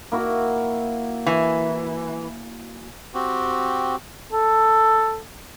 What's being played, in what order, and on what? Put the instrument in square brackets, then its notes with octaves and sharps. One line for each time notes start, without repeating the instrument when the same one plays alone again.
[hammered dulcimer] A#3 E4 F#4
[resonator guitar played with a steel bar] E3 [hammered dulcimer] G#5
[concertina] C4 F#4 G4
[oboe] A4